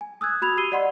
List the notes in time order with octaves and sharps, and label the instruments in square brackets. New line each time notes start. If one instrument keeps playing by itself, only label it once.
[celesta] G#5
D#6 E6 F#6 G#6
F#4 B5 G#6 F7
G4 E6 C7 D#7 G7
D5 D#5 F#5 B5 C6